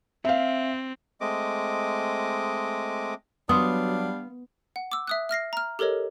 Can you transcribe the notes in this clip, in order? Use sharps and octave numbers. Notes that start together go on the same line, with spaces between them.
C4 E5 F5
G#3 A3 C4 D#5 D6
F#3 G3 B3 D4 F5 C6 D#6
F#5
D6 E6
E5 D#6 F#6
E5 F6 A#6 C7
A#5 F6
G4 A4 A#4 C#5 D#5